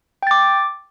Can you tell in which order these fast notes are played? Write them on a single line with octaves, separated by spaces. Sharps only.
G5 A6 D6